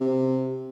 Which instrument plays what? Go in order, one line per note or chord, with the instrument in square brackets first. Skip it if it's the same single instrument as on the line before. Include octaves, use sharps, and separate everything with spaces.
[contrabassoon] C3